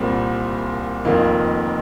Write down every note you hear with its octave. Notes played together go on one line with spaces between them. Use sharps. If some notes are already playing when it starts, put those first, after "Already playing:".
Already playing: C2 A#2 G3 C4
F1 F2 D#3 A#3 F4